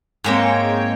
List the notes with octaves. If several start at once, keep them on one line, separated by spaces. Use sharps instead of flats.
G#2 G#3 A#3 C4 C#5 G5